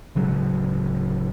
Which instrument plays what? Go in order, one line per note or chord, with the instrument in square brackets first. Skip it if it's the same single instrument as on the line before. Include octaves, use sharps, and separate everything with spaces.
[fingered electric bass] D1 C#3 F#3 G#3